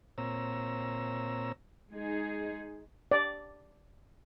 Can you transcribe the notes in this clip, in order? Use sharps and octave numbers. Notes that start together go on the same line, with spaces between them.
A#2 C4 C#5 A#5 E6
G#3 D#4 G#4
D5